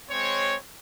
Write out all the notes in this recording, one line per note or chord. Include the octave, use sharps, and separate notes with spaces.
G#3 C4 C#5